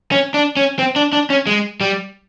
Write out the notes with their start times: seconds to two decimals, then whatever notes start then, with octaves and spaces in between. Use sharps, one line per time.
0.12 C#4
0.34 D4
0.57 C#4
0.79 C4
0.96 D4
1.13 D4
1.30 C#4
1.47 G#3
1.81 G3